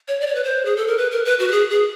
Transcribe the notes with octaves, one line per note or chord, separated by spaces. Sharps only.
C#5
D5
C#5
B4
C5
G#4
A4
A#4
B4
A#4
B4
F#4
G4
G#4
G#4